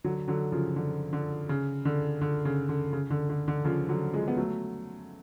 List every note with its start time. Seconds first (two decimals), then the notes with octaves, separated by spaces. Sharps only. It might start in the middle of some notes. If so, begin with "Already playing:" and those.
0.04 D3 F#3
0.28 D3 F#3
0.52 C#3 F3
0.76 D3
1.13 D3
1.49 C#3
1.85 D3
2.21 D3
2.45 C#3
2.69 D3
2.93 C#3
3.10 D3
3.29 D3
3.48 D3
3.65 C#3 F3
3.89 D3 F#3
4.13 F3 G#3
4.28 B3
4.37 F#3 A3